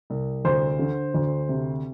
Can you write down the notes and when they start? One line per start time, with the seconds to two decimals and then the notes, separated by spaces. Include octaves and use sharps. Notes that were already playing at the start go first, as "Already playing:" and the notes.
0.10 C2
0.45 D2 C5
0.79 D3
1.14 D2
1.49 C3